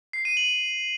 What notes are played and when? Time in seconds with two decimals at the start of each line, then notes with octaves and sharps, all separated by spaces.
0.13 C7
0.25 D#7
0.37 F#7